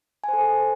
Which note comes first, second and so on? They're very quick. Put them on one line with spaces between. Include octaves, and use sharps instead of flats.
G#5 C5 A4